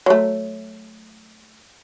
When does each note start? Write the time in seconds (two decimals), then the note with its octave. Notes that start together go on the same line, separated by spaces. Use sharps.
0.06 F#3 A3